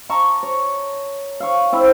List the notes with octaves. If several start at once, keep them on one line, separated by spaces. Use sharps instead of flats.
A5 A#5 C#6 D6
C#5
F5 C#6
C4 E4